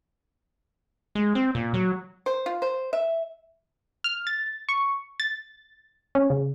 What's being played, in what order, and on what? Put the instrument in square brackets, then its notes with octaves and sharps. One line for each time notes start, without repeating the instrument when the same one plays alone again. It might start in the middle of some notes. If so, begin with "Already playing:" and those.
[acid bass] G#3
C4
A#2
F#3
[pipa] C5
F4
C5
E5
[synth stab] F6
A6
C#6
A6
C#4
C#3